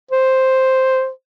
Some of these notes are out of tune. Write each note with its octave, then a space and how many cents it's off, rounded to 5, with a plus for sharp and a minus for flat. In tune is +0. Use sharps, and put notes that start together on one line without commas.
C5 +0